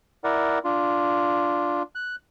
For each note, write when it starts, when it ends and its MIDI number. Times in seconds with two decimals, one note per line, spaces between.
0.24 0.59 64
0.24 0.59 70
0.24 0.59 74
0.24 0.59 78
0.64 1.83 62
0.64 1.83 65
1.95 2.16 90